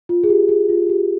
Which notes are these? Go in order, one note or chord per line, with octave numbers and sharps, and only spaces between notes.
F4
G#4
G4
G#4
F4
G4